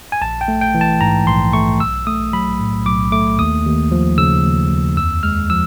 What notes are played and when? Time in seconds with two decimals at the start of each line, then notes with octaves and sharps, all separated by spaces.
0.12 G#5
0.22 A#1 A5
0.41 G5
0.48 A3
0.61 G5
0.75 E3
0.81 A5
1.01 G#2 A#5
1.27 A#1 C6
1.53 A3 C#6
1.80 B1 E6
2.07 A3 D#6
2.33 F#3 B5
2.60 A2
2.86 B1 D6
3.12 A3 D6
3.39 D#2 D#6
3.66 D#2
3.91 F3
4.18 C#3 E6
4.45 D#2
4.70 D#2
4.97 F2 E6
5.23 G#3 F6
5.50 F3 E6